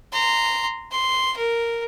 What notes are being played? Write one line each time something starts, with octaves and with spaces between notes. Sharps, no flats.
A#5 C6
C6
A#4